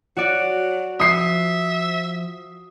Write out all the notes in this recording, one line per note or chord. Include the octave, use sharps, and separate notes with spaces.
F#3 F#4 D5
F3 E5 D#6 C7